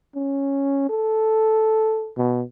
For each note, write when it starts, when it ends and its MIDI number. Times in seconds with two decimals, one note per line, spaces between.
0.15 0.87 61
0.90 2.12 69
2.17 2.43 47